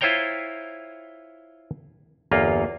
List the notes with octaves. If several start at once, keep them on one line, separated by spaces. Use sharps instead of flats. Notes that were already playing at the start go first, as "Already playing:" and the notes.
E4 F4 C5 C#5 G5 A#5
G1 E2 A#3 F4